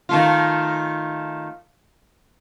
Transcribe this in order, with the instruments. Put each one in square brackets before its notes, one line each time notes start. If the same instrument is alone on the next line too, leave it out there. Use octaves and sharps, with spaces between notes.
[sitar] D#3 A3 F4